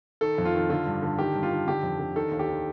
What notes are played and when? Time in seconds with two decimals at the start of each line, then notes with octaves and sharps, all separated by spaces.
0.21 D#3 A4
0.38 F2
0.45 F4
0.55 D#3
0.70 D3 F4
0.87 G2
1.02 D3
1.19 D#3 G4
1.35 G2
1.43 F4
1.51 D#3
1.67 D3 G4
1.83 F2
1.99 D3
2.16 D#3 A4
2.31 D#2
2.39 G4
2.49 D#3